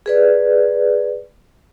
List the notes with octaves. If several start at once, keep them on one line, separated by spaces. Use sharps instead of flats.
G#4 B4 D5